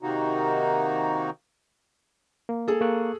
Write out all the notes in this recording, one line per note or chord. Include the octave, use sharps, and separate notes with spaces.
C3 D#3 A#3 D#4 F#4
A#3
G#4 A4
A#3 C#6 F#6